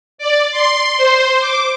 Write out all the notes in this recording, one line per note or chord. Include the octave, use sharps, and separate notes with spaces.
D5
C6
C5
D6